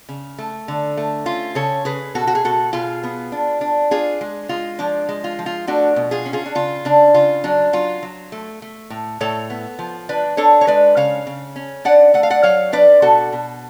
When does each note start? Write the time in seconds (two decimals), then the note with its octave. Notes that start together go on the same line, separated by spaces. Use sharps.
0.09 C#3
0.38 A3
0.68 D3
0.97 A3
1.26 C#4 F4
1.55 C#3 A4 C#5
1.85 C#3 G#4 B4
2.15 B2 F#4 A4
2.27 F#4
2.35 G#4
2.44 B2 F#4 A4
2.73 B2 F4 G#4
3.03 B3
3.32 D4
3.61 D4
3.91 D4 F4 G#4
4.21 G#3
4.49 G#3 F4
4.79 F3 D4
5.09 G#3
5.24 F4
5.39 F3
5.46 F4
5.67 A3 D4 F#4
5.96 B2
6.11 F4 G#4
6.26 C#4
6.33 F4 G#4
6.46 D4
6.55 C#3 F4
6.85 C#3 D4
7.14 C#3 F4
7.44 F#3 D4
7.73 F#3 F4
8.03 F#3
8.32 A3
8.62 A3
8.90 A2
9.20 A2 A4 C#5
9.50 B3
9.79 F3
10.09 D4 B4 D5
10.37 D4 A4 C#5
10.61 C#5
10.67 G#3 B4 D5
10.97 C#3 C#5 F5
11.27 C#3
11.56 C#4
11.85 D4 D5 F#5
12.14 A3 F#5
12.23 F5
12.30 D5 F#5
12.43 F#3 C#5 F5
12.72 D4 B4 D5
13.02 B2 F#4 A4
13.32 B2